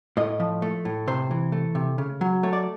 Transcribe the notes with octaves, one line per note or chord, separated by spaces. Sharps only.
A2 D#5
F3
A3
A2
C3 C5
E3
A3
C3
C#3
F#3
A3 C#5
D5